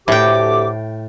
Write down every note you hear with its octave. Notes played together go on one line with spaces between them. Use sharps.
D2 A2 G4 G5 D6